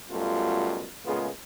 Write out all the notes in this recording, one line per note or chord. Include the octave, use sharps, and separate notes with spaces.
F#2 B2 G3 A3 F4
A#2 C#3 G#3 A3 B3 F4